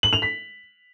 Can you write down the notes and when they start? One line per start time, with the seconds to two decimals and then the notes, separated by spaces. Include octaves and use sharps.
0.03 F#7
0.13 F7
0.22 B6